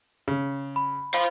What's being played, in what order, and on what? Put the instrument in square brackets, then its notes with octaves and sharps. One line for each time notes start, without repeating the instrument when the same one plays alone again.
[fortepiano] C#3
[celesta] B5
[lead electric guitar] C5 F5 [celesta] B5